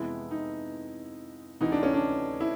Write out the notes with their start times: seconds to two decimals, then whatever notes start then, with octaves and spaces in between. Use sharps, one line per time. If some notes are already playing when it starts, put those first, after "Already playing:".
Already playing: F2 C3 E3 G#3 B3 E4
0.31 D#4
1.61 D2 C3 E3 D#4
1.72 D4
1.83 C#4
1.94 D4
2.41 E4